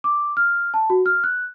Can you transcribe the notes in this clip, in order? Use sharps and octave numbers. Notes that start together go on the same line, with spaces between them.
D6
F6
A5
F#4
F6
F#6